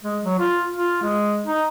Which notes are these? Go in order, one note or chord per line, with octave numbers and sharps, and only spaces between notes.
G#3
F#3
F4
F4
G#3
D#4